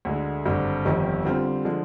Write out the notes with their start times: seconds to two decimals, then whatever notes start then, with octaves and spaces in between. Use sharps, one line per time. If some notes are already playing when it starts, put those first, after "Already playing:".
0.05 D2 D3 G#3
0.46 G#1 G2 D3
0.85 G1 F2 D#3 G3
1.25 D3 G3 C4 F4
1.65 D3 F3 G#3